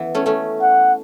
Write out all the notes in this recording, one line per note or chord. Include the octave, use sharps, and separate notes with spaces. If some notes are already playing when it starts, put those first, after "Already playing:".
Already playing: E3 B3
A3 C#4
A3 C#4
F#5